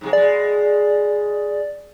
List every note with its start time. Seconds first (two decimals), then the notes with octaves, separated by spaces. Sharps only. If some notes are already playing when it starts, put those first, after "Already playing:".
0.01 G#2 C3 G#3
0.13 B2 G#3 D5